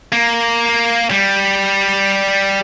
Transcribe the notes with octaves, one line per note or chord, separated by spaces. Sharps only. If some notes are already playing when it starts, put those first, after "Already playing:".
A#3
G3